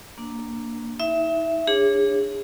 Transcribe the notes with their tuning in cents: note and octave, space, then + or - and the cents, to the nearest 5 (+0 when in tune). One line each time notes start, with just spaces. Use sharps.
A#3 -5 D4 +0
D#4 +40 E5 +10
D4 +0 G#4 -30 C#5 -10